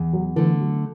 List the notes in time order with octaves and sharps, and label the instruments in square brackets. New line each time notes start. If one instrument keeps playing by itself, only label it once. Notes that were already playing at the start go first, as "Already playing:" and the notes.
Already playing: [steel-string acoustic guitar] E2
[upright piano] F#3
[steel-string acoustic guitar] D3 A3 [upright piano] E3
[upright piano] F#3